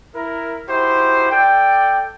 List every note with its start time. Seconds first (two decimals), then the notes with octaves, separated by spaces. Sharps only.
0.15 E4 A#4
0.68 D#4 E4 F#4 G4 C5
1.30 A4 D5 G5